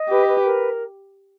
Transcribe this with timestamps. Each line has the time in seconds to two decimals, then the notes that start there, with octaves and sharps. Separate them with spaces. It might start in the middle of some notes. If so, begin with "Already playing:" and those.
Already playing: D#5
0.09 G4 B4
0.27 B4
0.44 A#4